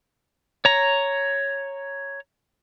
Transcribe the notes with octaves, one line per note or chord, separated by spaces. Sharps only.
C#5 A#5